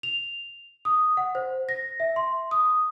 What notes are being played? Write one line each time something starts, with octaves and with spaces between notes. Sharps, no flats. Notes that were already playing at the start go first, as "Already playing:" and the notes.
F7
D#6
F#5
C5
A#6
E5
C6
D#6